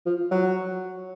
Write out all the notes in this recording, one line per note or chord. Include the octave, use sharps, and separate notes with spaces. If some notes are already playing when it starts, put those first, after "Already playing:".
F3
F#3